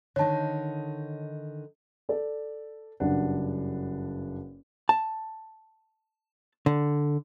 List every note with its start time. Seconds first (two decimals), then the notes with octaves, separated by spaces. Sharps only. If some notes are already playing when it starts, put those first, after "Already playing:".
0.16 D3 D#3 D#4 C#5 A5
2.09 A4 D5
3.00 F#1 G2 D4 F#5
4.89 A5
6.66 D3